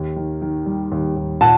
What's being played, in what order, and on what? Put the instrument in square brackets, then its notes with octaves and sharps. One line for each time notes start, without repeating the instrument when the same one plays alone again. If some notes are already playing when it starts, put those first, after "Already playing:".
Already playing: [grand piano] D#2
D#3
D#3
G3
D#2
D#2
[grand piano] A#2 [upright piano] F#5 A5